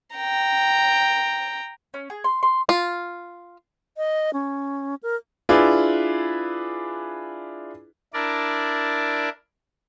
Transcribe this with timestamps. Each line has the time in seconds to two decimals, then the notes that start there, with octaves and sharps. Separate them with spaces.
0.16 G5 A#5
1.94 C#4
2.10 G#4
2.24 C6
2.43 C6
2.69 F4
3.97 D#5
4.33 C#4
5.03 A#4
5.49 D4 E4 F4 G#4 B4
8.14 D4 E4 A#4 D5